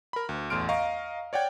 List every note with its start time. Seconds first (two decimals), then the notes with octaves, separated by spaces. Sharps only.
0.13 A#4 B5
0.29 D2
0.50 A1 E2 A3 C6 F6 D7
0.69 D#5 F5 A#5 C#6
1.33 C#5 D5 F#5 G5 G#6